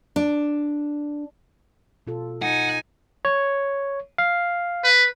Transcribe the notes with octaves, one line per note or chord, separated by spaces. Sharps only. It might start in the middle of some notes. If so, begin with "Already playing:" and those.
D4
B2 F4 A4
D#4 F#5 G#5
C#5
F5
B4